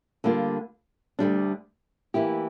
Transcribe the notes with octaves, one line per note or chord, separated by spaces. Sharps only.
D3 G3 A#3 F4
D2 D3 G3 D4
E3 A#3 E4 G4